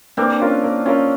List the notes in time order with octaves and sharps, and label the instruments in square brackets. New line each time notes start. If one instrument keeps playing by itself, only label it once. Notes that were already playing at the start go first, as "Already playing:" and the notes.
[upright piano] A#3 [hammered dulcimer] C4 D4
[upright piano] C#4 F4 A#4
A#3
C#4 F4 A#4